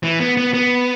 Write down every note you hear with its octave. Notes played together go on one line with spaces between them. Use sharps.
E3
B3
B3
B3